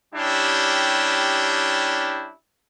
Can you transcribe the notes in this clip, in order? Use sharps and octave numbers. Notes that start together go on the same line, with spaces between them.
G3 C#4 D4 E4 G4